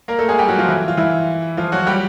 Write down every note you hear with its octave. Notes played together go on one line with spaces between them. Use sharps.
A#3 A#4
A3 A4
G#3 G#4
G3 G4
F#3 F#4
F3 F4
E3 E4
F4
E3 E4
F3 F4
F#3 F#4
G3 G4